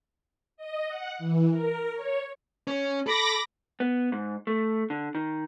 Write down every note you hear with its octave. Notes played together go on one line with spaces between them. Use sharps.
D#5
F#5
E3
A#4
C#5
C#4
A4 B5 D6 A#6
B3
G#2
A3
D3
D#3